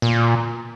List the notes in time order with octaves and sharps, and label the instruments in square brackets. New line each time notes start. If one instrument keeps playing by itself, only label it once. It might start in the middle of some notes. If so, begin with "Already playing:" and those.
[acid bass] A#2